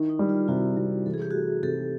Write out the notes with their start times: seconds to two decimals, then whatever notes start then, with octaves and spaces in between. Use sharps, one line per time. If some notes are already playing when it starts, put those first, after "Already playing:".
Already playing: D#3 E4
0.09 D#4
0.19 G3
0.29 F4
0.48 C3 E4 F#4
0.77 C3
1.06 E3 A4
1.14 G#4
1.22 G4
1.31 A3 F#4 G#4
1.63 C3 G4 A4